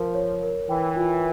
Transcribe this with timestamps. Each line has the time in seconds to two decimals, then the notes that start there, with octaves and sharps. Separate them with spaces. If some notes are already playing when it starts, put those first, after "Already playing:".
Already playing: F3 A#4
0.15 C#5
0.43 A#4
0.69 E3 G5
0.96 F4